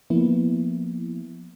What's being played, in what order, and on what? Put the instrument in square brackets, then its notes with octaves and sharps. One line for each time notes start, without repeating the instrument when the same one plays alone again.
[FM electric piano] F3 A#3 B3 E4